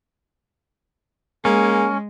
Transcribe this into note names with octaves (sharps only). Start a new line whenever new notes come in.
G#3 A#3 C#4 G#4